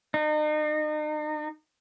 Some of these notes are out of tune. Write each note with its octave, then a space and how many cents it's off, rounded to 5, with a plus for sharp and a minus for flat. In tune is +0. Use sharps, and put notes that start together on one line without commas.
D#4 -40